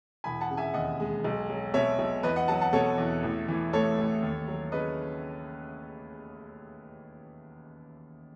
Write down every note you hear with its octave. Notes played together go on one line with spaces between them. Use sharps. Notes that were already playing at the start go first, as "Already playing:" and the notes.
E1 G#5 B5
F#5 A5
C#3
E5 G#5
D#2 D#5 F#5
G#3
B1
F#3
B2 C#5 E5
B1
E2 B4 D#5
D#5 F#5
F#3 F#5 A5
F#5 A5
B2 A4 C#5
E2
A1
E3
A2 A4 C#5
A1
D#2
F#3
C#3 B4 D#5